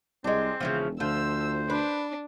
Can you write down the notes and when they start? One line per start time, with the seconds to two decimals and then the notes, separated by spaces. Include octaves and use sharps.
0.24 C2 G#3 C4 D4
0.61 E1 C#3 E3 F3
1.00 D2 F3 C5 E6
1.70 D4 B4